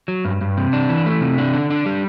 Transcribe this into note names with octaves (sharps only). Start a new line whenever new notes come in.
F#3
G2
G2
C3
D4
E3
A3
C3
D4
D3
D4
G3